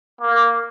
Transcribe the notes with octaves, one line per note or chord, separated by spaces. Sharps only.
A#3